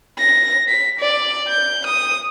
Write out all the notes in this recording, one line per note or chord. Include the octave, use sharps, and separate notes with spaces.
A#6
B6
D5
G6
D#6